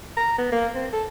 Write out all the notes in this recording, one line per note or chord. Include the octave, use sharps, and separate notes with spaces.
A#5
B3
A#3
C4
A4